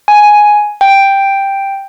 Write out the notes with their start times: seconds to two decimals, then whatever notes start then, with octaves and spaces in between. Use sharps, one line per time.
0.08 G#5
0.81 G5